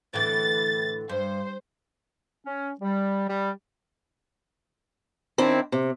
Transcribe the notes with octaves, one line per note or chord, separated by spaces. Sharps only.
A2 D3 E3 A6
G2 C5
C#4
G3
G3
D#3 C4 D4 E4
C3